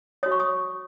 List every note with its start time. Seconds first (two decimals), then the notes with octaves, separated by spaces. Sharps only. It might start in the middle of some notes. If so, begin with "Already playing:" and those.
0.23 F#4 C#5 D#6
0.32 C#6
0.40 D#6